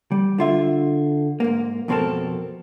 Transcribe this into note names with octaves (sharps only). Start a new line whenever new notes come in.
G3
D3 F4 E5
G#2 A#3
F2 B2 C4 A4 A#4 A5